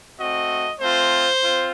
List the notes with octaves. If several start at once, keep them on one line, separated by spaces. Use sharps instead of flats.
A3 C4 F#4 D#5
A3 C4 F4 C5
C4 F4